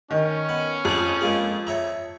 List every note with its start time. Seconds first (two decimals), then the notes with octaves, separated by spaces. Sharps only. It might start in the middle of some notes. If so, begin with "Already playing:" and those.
0.11 D#3 C#4
0.49 B3
0.85 F2 D4 G#4
1.21 G#3 A#3 G#4
1.67 C#5 E5 A#5